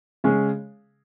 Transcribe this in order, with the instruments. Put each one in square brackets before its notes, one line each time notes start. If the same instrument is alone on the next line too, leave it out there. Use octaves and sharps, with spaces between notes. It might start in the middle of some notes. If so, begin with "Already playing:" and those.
[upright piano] C#3 G#3 C#4 G#4